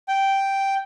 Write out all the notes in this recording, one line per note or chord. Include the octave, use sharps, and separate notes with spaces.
G5